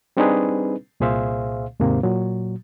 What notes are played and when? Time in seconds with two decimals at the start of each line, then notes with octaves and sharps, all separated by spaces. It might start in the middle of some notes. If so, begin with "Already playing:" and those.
0.17 G3 C4 D4 D#4 G#4 B4
1.00 C2 A#2 G#4 C5 E5 F5
1.80 D#2 G#2 C3 A#3
2.03 A#2 F#3